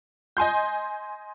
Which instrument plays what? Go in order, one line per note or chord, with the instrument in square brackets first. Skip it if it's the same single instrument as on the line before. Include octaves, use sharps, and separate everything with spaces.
[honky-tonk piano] D#5 G#5 C6 G6